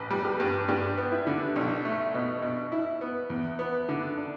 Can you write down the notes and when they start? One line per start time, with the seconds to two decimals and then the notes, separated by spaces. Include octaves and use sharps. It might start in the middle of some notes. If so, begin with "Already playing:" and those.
Already playing: A1 B4
0.10 G3
0.25 G4 B4
0.40 G2
0.68 G2 D4 G4
0.98 B3
1.12 E4
1.27 D3
1.56 B1 D4
1.85 A3
2.14 B2
2.42 B2
2.72 E4
3.01 B3
3.30 E2
3.59 B3
3.89 D3
4.17 D4